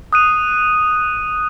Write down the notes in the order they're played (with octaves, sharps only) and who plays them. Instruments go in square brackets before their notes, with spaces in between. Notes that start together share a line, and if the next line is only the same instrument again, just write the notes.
[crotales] D#6 F#6 D#7